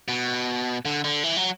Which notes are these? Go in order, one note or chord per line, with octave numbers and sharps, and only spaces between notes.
B2
D3
D3
E3
F#3